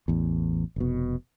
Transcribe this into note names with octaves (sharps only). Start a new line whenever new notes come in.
A1 E2
F1 B2